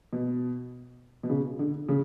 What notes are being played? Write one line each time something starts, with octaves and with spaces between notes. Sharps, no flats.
B2
B2
C#3
D3
C#3